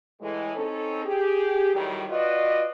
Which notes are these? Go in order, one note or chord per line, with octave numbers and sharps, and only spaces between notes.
A2 E3 G#3
C4 C#4 D#4 A4
G4 G#4
A2 D#3 F#3 G3
F4 F#4 B4 D5 D#5